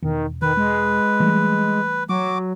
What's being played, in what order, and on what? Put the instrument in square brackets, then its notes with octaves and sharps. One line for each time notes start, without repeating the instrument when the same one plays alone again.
[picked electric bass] E1 [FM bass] D#3
[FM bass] D#3 [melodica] B4
[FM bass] G#3
[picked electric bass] E3 G3 A3
[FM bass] F#3 [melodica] F#4 D6